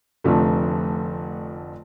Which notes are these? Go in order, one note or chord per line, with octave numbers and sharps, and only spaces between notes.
F1 F2 D3 F3 A3